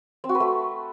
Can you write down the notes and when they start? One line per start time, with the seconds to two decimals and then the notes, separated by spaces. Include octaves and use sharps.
0.24 C4
0.29 F#4
0.35 B4
0.40 A3